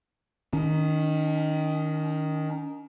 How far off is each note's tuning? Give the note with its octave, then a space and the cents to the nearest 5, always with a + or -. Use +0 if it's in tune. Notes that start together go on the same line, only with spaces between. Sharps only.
D#3 +0 C#4 +40